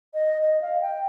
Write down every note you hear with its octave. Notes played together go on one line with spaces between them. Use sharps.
D#5
D#5
F5
G5